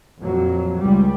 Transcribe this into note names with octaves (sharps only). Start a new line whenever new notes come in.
F2 A#2 F#3
C#2 G3